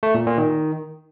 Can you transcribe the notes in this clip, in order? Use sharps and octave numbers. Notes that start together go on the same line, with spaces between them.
A3
A#2
A#2
D#3